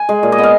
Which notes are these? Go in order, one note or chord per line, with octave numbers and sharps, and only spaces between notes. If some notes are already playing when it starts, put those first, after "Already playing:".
Already playing: G#5
G#3
A#2
D#5
B3 F5